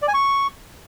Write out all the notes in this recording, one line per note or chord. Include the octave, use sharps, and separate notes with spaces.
D5
G#5
C#6